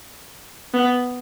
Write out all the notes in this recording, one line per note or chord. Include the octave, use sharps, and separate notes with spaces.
B3